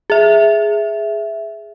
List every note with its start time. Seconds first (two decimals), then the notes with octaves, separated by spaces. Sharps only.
0.10 G#4 E5